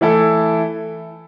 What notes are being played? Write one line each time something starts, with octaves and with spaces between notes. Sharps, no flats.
E3 A3 E4 A4